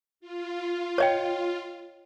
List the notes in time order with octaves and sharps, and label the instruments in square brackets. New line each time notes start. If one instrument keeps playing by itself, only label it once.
[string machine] F4
[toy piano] C#5 D#5 G5